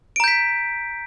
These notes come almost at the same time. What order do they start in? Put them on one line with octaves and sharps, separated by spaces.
D7 A#5 G6 B6